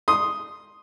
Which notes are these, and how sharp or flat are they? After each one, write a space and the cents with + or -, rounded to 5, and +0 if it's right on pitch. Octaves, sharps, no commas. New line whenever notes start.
C6 +0 D#6 +0